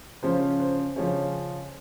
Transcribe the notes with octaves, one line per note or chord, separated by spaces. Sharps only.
C#3 F3 G#3 C#4 C5
C5
C#3 F3 G#3 C#4 C#5